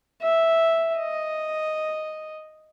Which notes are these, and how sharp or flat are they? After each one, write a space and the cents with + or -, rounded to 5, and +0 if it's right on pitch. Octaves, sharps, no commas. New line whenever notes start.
E5 -5
D#5 +0